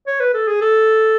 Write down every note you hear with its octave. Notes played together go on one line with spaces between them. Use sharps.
C#5
B4
A4
G#4
A4